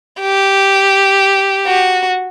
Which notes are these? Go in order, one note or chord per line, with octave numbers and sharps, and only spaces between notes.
G4
F#4